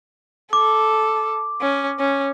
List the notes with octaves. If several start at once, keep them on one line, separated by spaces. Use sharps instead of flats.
A4 D6
C#4
C#4